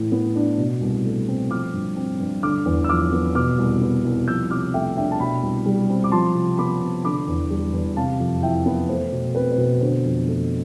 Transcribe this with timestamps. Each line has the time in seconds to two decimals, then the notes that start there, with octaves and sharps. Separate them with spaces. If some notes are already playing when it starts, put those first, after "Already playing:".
Already playing: A2 E3
0.12 B3
0.36 D4
0.58 B2
0.81 C2
1.05 A3
1.28 C4
1.51 F3 D6 F6
1.74 G2
1.96 C4
2.20 G2
2.43 D3 D6 F6
2.66 E2
2.84 E6
2.89 F3 D6 F6
3.13 B3
3.35 B2 D6 F6
3.58 C2
3.81 B3
4.05 C2
4.27 F3 E6 G6
4.50 C3 D6 F6
4.74 A3 E5 G5
4.97 D4 E5 G5
5.11 A5
5.19 B2 G5 B5
5.43 C2
5.66 G3
5.90 C4
6.04 D6
6.12 F3 A5 C6
6.35 C3
6.58 B3 B5 D6
6.81 C3
7.04 D3 B5 D6
7.28 E2
7.50 G3
7.73 E2
7.97 C3 F5 A5
8.20 F2
8.42 E3 E5 G5
8.66 B3
8.89 A3 C5
9.12 B2
9.35 C4 B4
9.52 B4
9.58 B2
9.81 D3 C5
10.04 F2
10.28 A3